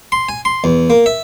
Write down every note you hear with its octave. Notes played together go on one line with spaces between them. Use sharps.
C6
G#5
C6
E2
A#3
E5